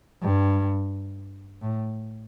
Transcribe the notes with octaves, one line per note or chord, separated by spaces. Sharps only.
G2
A2